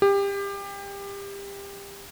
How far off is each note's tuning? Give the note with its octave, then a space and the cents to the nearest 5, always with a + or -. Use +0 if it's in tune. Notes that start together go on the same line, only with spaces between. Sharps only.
G4 +25